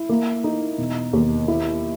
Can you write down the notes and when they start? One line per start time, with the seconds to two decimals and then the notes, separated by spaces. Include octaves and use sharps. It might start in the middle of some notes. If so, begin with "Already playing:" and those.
Already playing: E4
0.09 A#3
0.44 D#4
0.78 E1
1.13 D#2
1.48 E4